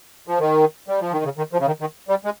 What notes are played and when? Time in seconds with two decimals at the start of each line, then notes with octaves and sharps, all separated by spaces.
0.27 F3
0.40 D#3
0.88 G3
1.00 F3
1.12 D#3
1.24 C#3
1.38 D#3
1.53 F3
1.60 C#3
1.67 D#3
1.81 D#3
2.09 G3
2.25 G#3